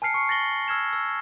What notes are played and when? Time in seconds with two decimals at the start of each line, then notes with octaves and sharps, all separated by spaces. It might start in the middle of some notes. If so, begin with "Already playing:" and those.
0.02 G#5 A5 F6 C7 C#7
0.14 C#6 C#7
0.29 A6 A#6 F#7 G7
0.68 E6 F6 G#6 E7
0.93 E6